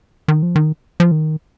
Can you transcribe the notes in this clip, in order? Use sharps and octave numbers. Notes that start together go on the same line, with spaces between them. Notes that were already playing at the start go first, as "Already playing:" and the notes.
D#3
F3
D#3
F3
D#3